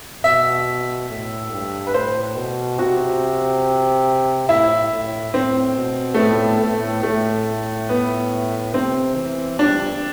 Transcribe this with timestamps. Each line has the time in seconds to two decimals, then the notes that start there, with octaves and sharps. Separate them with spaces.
0.24 B2 E5
1.09 A2
1.51 G2
1.87 B4
1.93 A2 C5
2.36 B2
2.79 C3 F#4
4.49 A2 E4
4.92 A2
5.33 A2 C4
5.76 B2
6.14 A3
6.18 A2 B3
6.61 A2
7.03 A2 A3
7.89 B3
8.74 C3 C4
9.16 E3
9.59 G3 D4